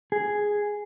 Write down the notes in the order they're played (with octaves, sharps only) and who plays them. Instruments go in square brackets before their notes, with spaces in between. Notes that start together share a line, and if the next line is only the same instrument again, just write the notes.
[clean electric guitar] G#4